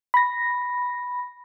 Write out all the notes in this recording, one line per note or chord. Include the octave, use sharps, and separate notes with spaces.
B5 A#6